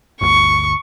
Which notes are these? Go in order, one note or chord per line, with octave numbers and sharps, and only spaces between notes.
G1 D2 C#6